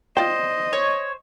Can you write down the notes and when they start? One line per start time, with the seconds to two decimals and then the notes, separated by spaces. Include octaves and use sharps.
0.17 F4 C5 D5 D#5 G5
0.73 C#5